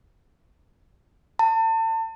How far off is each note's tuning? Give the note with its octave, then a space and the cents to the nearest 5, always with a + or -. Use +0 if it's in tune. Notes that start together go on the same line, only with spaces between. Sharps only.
A5 +35